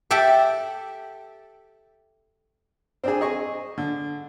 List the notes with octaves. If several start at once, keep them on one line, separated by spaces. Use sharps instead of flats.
G4 A4 E5 F#5 G5 A5
C4 D4 G#4
G#4 D#5 C#6
D3